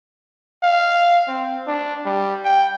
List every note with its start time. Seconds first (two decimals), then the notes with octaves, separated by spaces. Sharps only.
0.63 F5
1.28 C4
1.67 D4
2.05 G3
2.44 G5